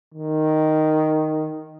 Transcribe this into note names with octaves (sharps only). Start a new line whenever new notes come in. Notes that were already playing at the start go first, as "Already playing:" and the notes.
D#3